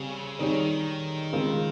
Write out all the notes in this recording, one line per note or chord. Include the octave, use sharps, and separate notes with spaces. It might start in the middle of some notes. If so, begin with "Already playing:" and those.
Already playing: C#3 G3 C4
D#3 G3 C4 D#4 G#4 C#5
C#3 G#3 C4 F4 A#4